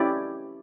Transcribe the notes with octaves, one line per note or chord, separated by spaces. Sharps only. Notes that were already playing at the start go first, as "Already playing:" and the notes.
Already playing: C#4 E4 G4 D5